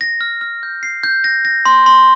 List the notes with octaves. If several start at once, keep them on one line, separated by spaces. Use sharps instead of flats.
A#6
F6
F6
G6
C7
G6
A#6
A#6
C6
C6